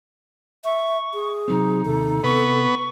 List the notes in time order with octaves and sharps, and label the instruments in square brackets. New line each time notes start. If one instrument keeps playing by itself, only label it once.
[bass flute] E5 [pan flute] C#6
[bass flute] G#4
[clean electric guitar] C3 F#3 C4 [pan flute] D#4
[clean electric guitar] D#2 C3 [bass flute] A4
[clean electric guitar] C3 [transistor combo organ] B3 [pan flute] C#6